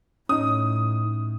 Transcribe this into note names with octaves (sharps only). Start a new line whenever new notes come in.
A2 C#4 D#4 D#6